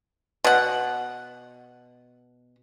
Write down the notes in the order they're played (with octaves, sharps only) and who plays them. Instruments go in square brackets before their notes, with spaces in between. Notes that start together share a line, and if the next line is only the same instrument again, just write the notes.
[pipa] B2 F#5